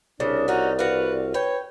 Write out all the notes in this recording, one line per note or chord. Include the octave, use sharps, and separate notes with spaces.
C2 C#3 D4 D5
C#4 D#4 F#4
F#4 B4 F5
B4 C#5 G5